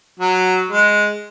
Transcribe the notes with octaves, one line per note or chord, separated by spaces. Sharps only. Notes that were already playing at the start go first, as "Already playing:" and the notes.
F#3
G#3